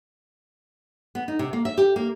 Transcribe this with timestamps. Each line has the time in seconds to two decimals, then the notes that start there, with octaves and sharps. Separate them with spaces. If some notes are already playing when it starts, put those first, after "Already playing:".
1.15 B3
1.28 D#4
1.39 C3
1.53 A#3
1.65 E5
1.78 G4
1.96 A#3